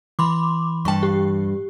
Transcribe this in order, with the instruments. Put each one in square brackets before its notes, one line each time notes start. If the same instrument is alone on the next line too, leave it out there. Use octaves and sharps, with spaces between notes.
[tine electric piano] E3 [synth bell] B5 C6 D6
[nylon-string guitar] G2 A5 [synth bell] G5 C#6
[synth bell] G4